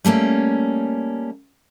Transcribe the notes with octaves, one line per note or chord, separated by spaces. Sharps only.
G3 A3 A#3 C#4